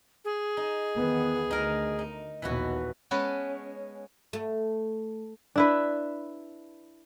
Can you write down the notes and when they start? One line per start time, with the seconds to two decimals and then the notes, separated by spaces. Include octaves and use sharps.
0.25 G#4
0.57 D#4
0.95 E2 D#3 B3
1.51 D2 D#4 A#4
1.99 D#4
2.42 A#1 D#2 B2 E3 B3 F#4
3.11 G#3 B3 C#4 B4 A5
4.33 A3
5.56 D4 E4 B4